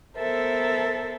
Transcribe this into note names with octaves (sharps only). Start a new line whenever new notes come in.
B3 A4 A#4 C5 E5